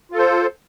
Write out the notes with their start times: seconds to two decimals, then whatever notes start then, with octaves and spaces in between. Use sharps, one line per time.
0.12 F4
0.15 A4
0.18 C5